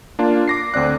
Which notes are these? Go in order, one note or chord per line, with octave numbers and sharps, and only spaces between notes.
A#3 D4 F4
D6 A#6 C7
D2 C4 D5 F#6